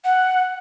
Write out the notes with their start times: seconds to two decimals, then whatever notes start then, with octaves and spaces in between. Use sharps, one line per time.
0.04 F#5